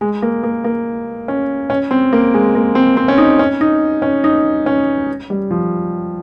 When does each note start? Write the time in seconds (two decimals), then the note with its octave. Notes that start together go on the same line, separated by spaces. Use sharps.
0.01 G#3
0.22 A#3
0.43 A#3
0.64 A#3
1.28 C#4
1.70 C#4
1.91 C4
2.13 A#3
2.34 G#3
2.55 A#3
2.75 C4
2.97 C4
3.08 C#4
3.18 D#4
3.39 C#4
3.61 D#4
4.02 C#4
4.24 D#4
4.66 C#4
5.30 G3
5.51 F3